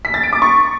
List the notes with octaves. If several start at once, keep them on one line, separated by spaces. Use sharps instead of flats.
B6
A6
D7
D6
C#6